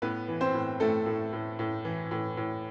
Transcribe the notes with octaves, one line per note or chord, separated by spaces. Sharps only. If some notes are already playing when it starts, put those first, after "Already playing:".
A2 B3 B4
E3
C4 C5
A2
A2 A3 A4
A2
A2
A2
E3
A2
A2